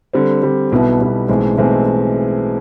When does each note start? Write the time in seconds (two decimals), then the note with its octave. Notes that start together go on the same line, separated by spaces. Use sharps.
0.13 D3 G3 C4
0.42 D3 G3 C4
0.72 B1 B2 G3 B3 E4
1.00 B1 B2 G3 B3 E4
1.28 B1 A2 E3 G#3 C4
1.57 B1 A2 E3 G#3 C4